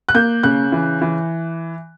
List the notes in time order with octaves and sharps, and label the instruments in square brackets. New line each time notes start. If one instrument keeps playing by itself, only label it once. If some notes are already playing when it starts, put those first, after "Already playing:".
[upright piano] F#6
A#3 G6
C#3 F#6
E3
E3